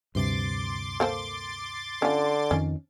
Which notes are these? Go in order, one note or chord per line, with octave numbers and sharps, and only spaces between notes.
D2 G2 C3 C6 D6 A6
A#3 A4 C5
D3 C#4 F4
F2 D#3 C#4